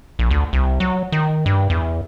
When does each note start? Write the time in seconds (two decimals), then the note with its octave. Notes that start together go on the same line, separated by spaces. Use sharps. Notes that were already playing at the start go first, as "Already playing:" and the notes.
0.19 A#1
0.31 D2
0.53 C2
0.80 F#3
1.12 D#3
1.46 G2
1.70 E2